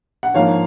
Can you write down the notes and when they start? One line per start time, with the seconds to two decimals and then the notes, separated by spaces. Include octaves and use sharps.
0.23 F#5
0.34 G#2 F3 A#3 C#5 F5